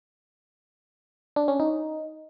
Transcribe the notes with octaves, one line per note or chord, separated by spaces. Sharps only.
D4
C#4
D#4